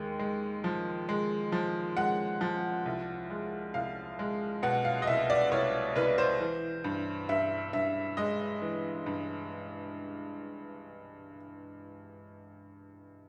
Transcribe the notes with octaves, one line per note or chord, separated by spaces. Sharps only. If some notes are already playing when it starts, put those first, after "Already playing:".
Already playing: D#2 G#3 G5
G#3
F3
G#3
F3
G#3 F#5
F3
C2
G#3
C2 F5
G#3
B2 F#5
F5
D#5
C2 E5
D5
C2 C#5
C2 B4
C5
E3
G2
G2 E5
G2 E5
G#3 D#5
E3
G2